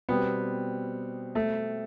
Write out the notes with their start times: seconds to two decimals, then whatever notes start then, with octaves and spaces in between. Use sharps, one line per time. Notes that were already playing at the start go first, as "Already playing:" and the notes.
0.09 B2 G3 B3 C4
1.35 A3